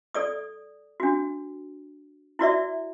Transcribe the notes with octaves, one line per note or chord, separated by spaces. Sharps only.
A4 D5 D#6
D4 F#4
E4 F#4 D5 E5